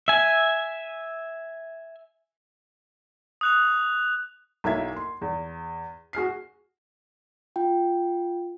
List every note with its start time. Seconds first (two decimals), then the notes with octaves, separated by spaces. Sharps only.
0.08 E5 G#5
3.41 D#6 F#6 F7
4.64 B1 A#3 E4 E5 G#6
4.96 C6
5.22 E2
6.13 F#4 G#4 F6 C7
7.56 F4 G5